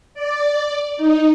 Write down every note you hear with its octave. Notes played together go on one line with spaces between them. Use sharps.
D5
D#4